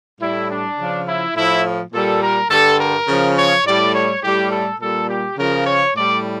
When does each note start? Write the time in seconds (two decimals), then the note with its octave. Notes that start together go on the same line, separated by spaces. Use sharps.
0.20 A2 G3 E4
0.49 D4
0.78 C#3 F3
1.06 E4
1.35 A2 F3 E4
1.93 A#2 G3 A4
2.21 A#4
2.49 G2 D3 G3 A4
2.78 A#4
3.07 C#3 F3
3.36 C#5
3.64 A2 G3 D5
3.93 C#5
4.22 A2 G3 G4
4.51 A4
4.79 A#2 G3 A4
5.08 G4
5.37 C#3 F3 A#4
5.65 C#5
5.94 A2 G3 D5